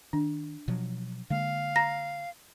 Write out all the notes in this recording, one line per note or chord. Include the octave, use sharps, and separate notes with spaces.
D#3 D4
B2 F3 F#3
D3 G#3 A#3 F5
A#5 A#6